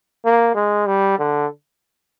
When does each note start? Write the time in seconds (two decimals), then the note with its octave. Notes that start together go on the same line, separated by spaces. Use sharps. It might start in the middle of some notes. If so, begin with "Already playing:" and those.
0.25 A#3
0.55 G#3
0.87 G3
1.18 D3